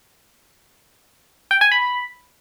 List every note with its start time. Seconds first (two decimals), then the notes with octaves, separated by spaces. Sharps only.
1.51 G5
1.61 G#5
1.72 B5